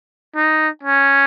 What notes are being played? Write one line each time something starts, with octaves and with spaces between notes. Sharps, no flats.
D#4
C#4